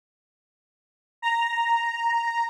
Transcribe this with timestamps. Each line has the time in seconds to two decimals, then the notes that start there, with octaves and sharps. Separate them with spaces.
1.22 A#5